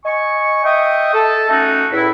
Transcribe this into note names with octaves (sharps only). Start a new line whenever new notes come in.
D#5 G#5 C#6
D#5 E5 G5 C#6 D#6
A4
A3 C#4 D#4 F#4
E2 A2 E4